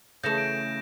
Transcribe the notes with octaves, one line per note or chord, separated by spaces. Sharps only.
C#3 E3 A3 G6 A#6 E7
D7